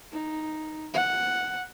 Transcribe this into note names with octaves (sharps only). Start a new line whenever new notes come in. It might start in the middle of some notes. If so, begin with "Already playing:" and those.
D#4
F#5